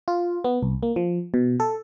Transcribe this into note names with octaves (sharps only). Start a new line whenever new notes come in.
F4
B3
C2
A#3
F3
B2
A4